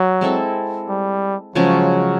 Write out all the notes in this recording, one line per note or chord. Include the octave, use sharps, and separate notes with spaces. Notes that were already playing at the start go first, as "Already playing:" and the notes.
Already playing: F#3
G#3 C4 E4 A4
G3
C#3 F3 F#3 G#3 C#4